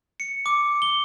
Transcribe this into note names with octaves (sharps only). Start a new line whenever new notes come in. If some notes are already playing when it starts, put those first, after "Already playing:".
C#7
D6
G7